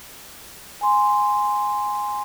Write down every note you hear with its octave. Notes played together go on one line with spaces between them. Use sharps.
G#5 C6